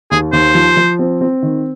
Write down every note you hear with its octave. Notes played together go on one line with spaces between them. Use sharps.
D#2 G#4
D#2 C5
F3
F3
C4
C4
D#3